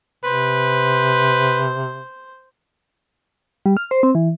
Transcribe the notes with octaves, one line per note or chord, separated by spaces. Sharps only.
C3 B4 C5
G3
F6
C5
C4
E3